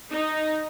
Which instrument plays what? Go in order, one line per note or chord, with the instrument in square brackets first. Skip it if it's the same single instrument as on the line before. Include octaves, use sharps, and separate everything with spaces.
[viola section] D#4